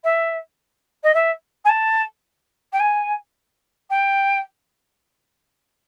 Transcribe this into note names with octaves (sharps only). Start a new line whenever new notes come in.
E5
D#5
E5
G#5
A5
G5
G#5
G5